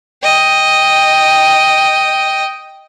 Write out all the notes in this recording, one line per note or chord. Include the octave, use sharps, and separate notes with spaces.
D#5 G5